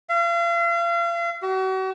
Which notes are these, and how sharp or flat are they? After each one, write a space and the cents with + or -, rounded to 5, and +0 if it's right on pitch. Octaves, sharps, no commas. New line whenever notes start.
F5 -40
F#4 +40